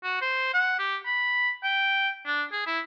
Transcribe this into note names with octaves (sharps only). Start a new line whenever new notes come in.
F#4
C5
F#5
G4
B5
G5
D4
G#4
E4